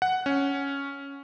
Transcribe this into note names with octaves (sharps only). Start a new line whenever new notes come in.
F#5
C#4